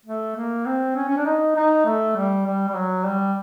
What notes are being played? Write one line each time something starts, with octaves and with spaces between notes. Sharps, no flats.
A3
A#3
C4
C#4
C#4
D4
D#4
D#4
A3
G3
G3
G3
F#3
G3